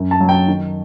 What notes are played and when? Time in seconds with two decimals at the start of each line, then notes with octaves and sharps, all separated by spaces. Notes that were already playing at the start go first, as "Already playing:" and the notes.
Already playing: F#2
0.11 A5
0.20 F#3
0.29 G5
0.48 D#3